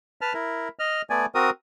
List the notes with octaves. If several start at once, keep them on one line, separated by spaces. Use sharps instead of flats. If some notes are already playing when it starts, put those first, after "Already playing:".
B4 A5 F6
E4 A#4
D#5 F6
A3 B3 D5 G#5
C4 F#4 A#4 D#6